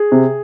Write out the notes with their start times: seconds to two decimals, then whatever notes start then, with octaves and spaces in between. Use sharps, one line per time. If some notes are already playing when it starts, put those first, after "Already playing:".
Already playing: G#4
0.12 C3